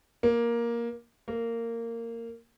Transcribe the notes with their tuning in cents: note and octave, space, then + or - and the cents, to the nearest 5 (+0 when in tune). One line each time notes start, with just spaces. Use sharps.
A#3 +10
A#3 -15